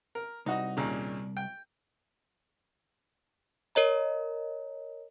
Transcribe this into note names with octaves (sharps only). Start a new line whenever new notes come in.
A#4
C2 D#4 F#4 D#5
D#2 A#2 C#3
G5
A#4 C#5 D#5 A#5